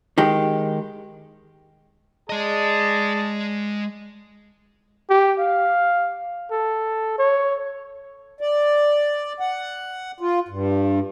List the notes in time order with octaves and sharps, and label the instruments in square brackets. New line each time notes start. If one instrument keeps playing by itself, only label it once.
[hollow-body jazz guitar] D#3 G#3 G4
[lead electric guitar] G#3 D#5 [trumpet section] G#4 D5 A5
[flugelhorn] G4
F5
A4
C#5
[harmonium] D5
F#5
F4
G2